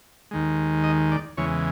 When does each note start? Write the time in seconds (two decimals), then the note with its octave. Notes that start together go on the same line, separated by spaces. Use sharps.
0.31 D#2 D#3 G#3
0.84 D#5
1.11 D5
1.37 E2 C#3 E3 G#3 C#5